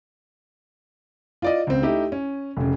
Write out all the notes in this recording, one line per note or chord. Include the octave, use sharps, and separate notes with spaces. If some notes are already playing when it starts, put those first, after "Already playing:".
F4 D5 D#5
C#2 C4
A3 D#4 E4 G4
C#4
F1 C#3